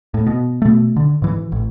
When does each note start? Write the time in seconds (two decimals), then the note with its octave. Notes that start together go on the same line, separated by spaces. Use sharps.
0.14 A2
0.26 B2
0.62 B2 A3
0.96 D3
1.22 G#2 E3
1.52 A1